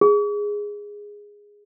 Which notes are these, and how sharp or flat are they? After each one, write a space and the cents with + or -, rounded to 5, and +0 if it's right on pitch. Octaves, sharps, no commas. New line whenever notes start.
G#4 -10